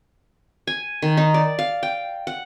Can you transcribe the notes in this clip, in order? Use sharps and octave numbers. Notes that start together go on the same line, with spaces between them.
G#5
D#3
D#4
D5
F5
G5
F#5